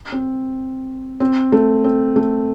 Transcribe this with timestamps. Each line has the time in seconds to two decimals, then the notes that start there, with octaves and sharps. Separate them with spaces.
0.12 C4
1.20 C4
1.52 A3
1.84 C4
2.16 A3